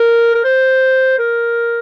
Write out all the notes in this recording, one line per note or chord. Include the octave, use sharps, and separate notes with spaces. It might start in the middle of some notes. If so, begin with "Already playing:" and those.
Already playing: A#4
A#4
C5
A#4